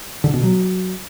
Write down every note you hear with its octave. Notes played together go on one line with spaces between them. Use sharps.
D3
B2
F#3